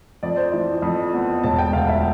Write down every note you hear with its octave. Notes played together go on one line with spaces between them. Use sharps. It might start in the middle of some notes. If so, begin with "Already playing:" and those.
F2 D5
C5
E3 D5
F2
B3
E1 A5
G5
D2 F5
E5